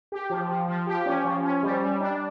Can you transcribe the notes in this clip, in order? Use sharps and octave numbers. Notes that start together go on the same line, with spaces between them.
G4
F3
F3
F3
G4
C#4
F3
C#4
G3
G3
D4